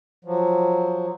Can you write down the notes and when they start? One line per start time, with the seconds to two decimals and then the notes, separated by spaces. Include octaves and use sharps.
0.25 F3 F#3